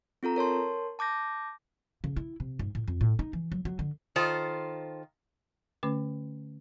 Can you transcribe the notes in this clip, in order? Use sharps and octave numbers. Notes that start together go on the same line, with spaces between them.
C4 F4 A4 A#5
A#4 C#5 A5 C6
A5 D6 G6 A#6
C#3
E4
C3
G#2
A2
F2
A2
D#4
E3
F#3
F#3
D3
D#3 F4 A4 C5
D3 A3 C#4 B4